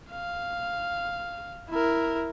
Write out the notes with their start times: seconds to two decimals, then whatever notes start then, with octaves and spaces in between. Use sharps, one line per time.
0.12 F5
1.70 E4 A#4